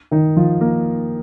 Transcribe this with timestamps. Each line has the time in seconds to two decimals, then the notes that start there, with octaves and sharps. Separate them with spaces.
0.11 D#3 D#4
0.36 F3 F4
0.61 A#3 A#4